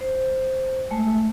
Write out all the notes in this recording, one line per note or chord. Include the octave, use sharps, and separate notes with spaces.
C5
G#3 A3